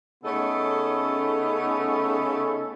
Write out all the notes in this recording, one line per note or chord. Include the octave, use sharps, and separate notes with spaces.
C#3 A3 B3 C#4 D#4 A4